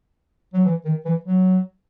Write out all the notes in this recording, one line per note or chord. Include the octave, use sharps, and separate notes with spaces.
F#3
E3
D#3
E3
F#3